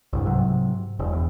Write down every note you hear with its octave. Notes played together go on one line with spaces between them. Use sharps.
C2 G2
G#2 C3 F#3
E1
E2